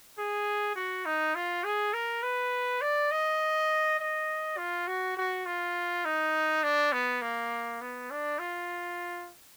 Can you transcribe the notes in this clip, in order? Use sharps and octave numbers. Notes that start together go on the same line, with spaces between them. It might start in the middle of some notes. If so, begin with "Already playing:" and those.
G#4
F#4
D#4
F4
G#4
A#4
B4
D5
D#5
D#5
F4
F#4
F#4
F4
D#4
D4
B3
A#3
B3
D4
F4